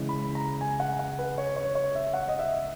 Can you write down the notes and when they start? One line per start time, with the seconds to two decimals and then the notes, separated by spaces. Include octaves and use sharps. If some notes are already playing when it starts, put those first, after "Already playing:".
Already playing: C#3 E3 G#3
0.09 B5
0.35 A#5
0.61 G#5
0.80 F#5
0.99 F#5
1.19 B4
1.38 C#5
1.56 C#5
1.75 C#5
1.95 E5
2.13 F#5
2.28 D#5
2.39 E5